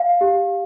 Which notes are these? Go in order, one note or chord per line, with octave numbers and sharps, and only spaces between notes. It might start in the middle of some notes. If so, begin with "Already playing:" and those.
Already playing: F5
G4